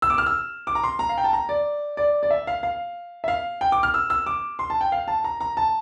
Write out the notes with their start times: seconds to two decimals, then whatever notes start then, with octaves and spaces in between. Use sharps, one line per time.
0.02 E6
0.10 D6
0.18 F6
0.26 E6
0.67 D6
0.75 A#5
0.84 C6
0.99 A#5
1.09 F5
1.18 G5
1.24 A5
1.33 A#5
1.49 D5
1.97 D5
2.23 D5
2.31 E5
2.47 F5
2.63 F5
3.24 E5
3.28 F5
3.61 G5
3.72 D6
3.83 F6
3.94 E6
4.10 E6
4.26 D6
4.59 C6
4.70 A5
4.81 G5
4.92 F5
5.08 A5
5.24 A#5
5.40 A#5
5.57 A5